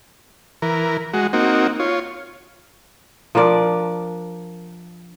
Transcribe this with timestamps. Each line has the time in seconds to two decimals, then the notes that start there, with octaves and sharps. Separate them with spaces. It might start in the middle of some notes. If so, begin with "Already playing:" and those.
0.62 E3 A#4
1.13 G#3 F#4
1.33 A#3 C4 D#4 F#4
1.80 F4 C#5
3.35 F3 D4 A#4 D5